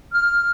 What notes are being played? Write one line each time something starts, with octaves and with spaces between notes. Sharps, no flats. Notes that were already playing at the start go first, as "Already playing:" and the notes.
F6